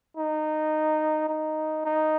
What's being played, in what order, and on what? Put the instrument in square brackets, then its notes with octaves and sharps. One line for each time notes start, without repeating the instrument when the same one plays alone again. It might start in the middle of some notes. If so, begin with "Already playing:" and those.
[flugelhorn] D#4
D#4
D#4